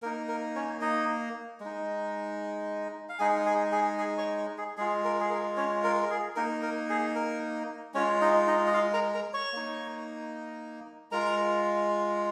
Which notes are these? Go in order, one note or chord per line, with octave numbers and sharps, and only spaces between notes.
A#3 D#4 A#4
A#4
C#4 C#5
D#4 D#5
G#3 D#4
F5
G#3 D#4 G#4 G#5
G#4 G#5
G#4 G#5
G#4 G#5
C#5 C#6
G#4
G#3 F4 G#4
A#4
G#4
A#4
C#4 C#5
A#4
A#4
G#4
A#3 D#4 A#4
A#4
G#4
A#4
G#3 C#4 F4 C#5
D#4 D#5
D#4 D#5
D#5
F4 F5
A#4 A#5
A#4 A#5
C#5 C#6
A#3 D#4
G#3 F4 A#4 A#5